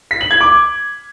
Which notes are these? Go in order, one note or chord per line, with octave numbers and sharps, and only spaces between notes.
B6
F#7
G#6
D6